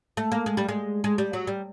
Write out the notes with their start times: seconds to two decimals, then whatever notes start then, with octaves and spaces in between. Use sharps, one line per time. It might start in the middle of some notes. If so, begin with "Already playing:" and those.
0.17 A3
0.32 A#3
0.46 G#3
0.57 G3
0.68 G#3
1.04 G#3
1.18 G3
1.33 F#3
1.47 G3